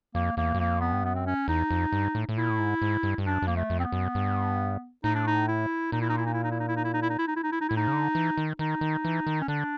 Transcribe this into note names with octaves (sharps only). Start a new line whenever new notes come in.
F2 A#3
E2 A#3
F#2
F2 A#3
B3
G2
F#2 B3
C4
C#4
E2 D#4
F2
G2
A2
A2
A#2 E4
A2
G#2
G#2
G2
G2
F#2 D4
F#2
F2 A#3
A3
F2
C4
B3
F#2
G2
A2 D#4
D4
D#4
E4
A#2 D#4
E4
D#4
E4
D#4
E4
D#4
E4
D#4
E4
D#4
E4
D#4
E4
D#4
E4
D#4
E4
D#4
E4
D#4
A2 E4
D#4
C#3
D3
E3
D#3
D#3 D#4
D#3
E3
D#3
C#4
D3 D4